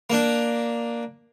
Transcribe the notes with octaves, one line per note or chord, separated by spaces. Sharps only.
A#3 D4